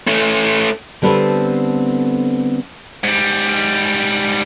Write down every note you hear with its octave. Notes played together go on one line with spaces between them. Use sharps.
A3 C#4
D3 G3 B3 C4 A4 B4
G#2 G3